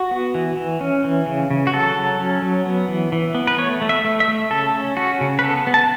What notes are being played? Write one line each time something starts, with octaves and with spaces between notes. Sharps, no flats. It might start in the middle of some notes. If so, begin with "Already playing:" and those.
Already playing: F#4
B3
E3
E3
C#4
E3
C#3
C#3
F#4
F#3 A4
F#3
C#4
F#3
B3
E3
E3
B3
B4
A3 C#5
A3
E5
A3
E5
A3
C#3 A4
C#4
C#4 F#4
C#3
B4
B3 A4
B3
A5